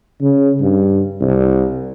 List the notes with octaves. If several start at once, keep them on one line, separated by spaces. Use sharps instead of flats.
C#3
G2
C2